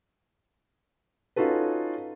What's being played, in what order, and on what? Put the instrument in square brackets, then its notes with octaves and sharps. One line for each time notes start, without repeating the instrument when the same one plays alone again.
[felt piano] C#4 D#4 F4 F#4 A4 B4